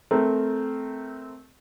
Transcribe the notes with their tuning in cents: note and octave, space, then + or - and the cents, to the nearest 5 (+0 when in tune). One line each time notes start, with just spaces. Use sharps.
A3 -15 C4 -10 A#4 -10